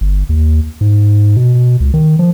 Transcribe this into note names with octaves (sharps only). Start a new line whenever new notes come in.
G1
D#2
G#2
B2
C#2
D#3
F3